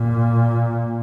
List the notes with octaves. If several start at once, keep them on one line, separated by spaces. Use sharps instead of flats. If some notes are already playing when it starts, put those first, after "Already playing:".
Already playing: A#2